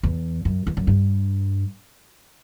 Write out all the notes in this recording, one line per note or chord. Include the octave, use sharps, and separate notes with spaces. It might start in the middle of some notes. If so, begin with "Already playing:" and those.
E2
F#2
E2
F#2
G2